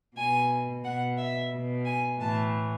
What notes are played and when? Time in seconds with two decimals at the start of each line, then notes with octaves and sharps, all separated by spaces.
0.17 B2 G#5
0.84 B2 F#5
1.18 E5
1.52 B2
1.85 G#5
2.19 A2 E3 A5